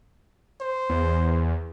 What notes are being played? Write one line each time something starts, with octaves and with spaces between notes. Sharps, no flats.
C5
E2